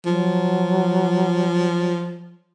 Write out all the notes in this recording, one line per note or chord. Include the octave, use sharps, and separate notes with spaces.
F3 F#3